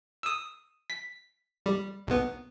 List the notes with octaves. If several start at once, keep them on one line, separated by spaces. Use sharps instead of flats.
D#6 E6
B6
G3
B1 B3